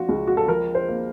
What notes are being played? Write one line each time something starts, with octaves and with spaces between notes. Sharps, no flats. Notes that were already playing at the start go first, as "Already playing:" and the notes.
Already playing: F3 F4 F#4
C#2
F#4
A4
F3 A#4
C5
A#3